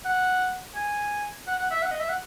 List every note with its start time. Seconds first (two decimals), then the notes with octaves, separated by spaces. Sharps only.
0.05 F#5
0.75 G#5
1.47 F#5
1.58 F#5
1.71 E5
1.82 F#5
1.91 D#5
2.00 E5
2.09 F#5